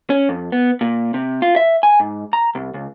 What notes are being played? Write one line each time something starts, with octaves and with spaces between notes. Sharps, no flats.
C#4
F2
B3
A#2
C3
F4
E5
G#5
G#2
A#5
C2
C#2